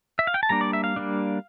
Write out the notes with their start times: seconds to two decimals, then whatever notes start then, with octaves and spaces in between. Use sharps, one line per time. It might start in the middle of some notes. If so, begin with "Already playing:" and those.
0.19 E5
0.27 F5
0.34 G5
0.43 A5
0.49 G3 A#3 D4 A#5
0.61 D5
0.73 E5
0.84 F5
0.96 G3 A#3 D4